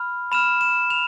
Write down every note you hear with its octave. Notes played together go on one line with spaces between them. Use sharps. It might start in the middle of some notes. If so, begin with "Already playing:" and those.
Already playing: B5 F6
B5 F6 E7
E7
F7